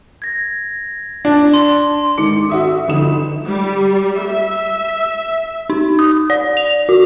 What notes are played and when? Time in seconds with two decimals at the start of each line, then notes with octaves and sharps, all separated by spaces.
0.22 G#6 A#6
1.25 D4
1.54 C6
2.18 G#2 D#3 D6 C#7
2.50 F#4 E5 D#6
2.88 G1 F3 D#4 D#6 E7
3.45 G3
4.18 E5
5.70 D#4
5.99 D#6
6.30 D5
6.57 F7
6.89 F#4